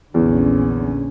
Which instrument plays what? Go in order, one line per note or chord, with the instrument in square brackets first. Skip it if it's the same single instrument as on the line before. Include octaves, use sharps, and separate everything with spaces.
[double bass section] A#1 D3 C#4 [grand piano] E2